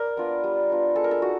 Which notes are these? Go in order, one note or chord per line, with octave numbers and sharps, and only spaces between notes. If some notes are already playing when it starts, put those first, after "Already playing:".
Already playing: A#4 D5
B3 D4 F4
G3
B3 D4 F4
G#3 A4
A#4
A4
D#4 F#4